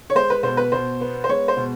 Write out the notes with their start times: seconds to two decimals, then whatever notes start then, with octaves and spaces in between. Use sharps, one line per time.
0.10 C#5
0.15 G#3 C5
0.30 B4
0.43 B2 C5
0.57 B4
0.72 B2 C5
1.01 B3
1.24 C5
1.29 G#3 C#5
1.48 C5
1.57 B2